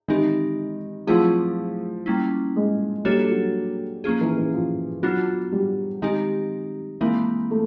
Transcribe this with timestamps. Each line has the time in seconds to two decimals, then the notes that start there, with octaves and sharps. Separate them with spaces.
0.08 D#3 E3 G#3 C4 D#4 G4
1.07 F3 F#3 A3 C4 E4 G#4
2.06 G3 A#3 C#4 E4
2.56 G#3
3.05 G3 A#3 D4 F#4 A4 C#5
3.30 F#3
4.04 F3 A#3 C#4 F4 G#4
4.21 E3
4.37 E3
4.54 F3
5.03 F#3 B3 D4 F4
5.52 G3
6.02 D#3 G#3 C4 D#4 G4
7.01 E3 G#3 A#3 C4 E4
7.51 A3